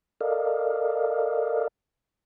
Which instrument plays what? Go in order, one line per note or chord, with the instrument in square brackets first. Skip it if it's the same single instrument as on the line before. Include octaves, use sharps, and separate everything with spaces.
[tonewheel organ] A4 A#4 D5 D#5 F5